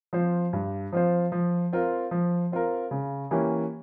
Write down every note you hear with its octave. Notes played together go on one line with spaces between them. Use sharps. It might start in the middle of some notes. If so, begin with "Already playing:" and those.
F3 C4 F4 C5
G2
F3 C4 F4 C5
F3
C4 F4 A#4
F3
C4 F4 A#4
C#3
E3 A#3 C#4 G4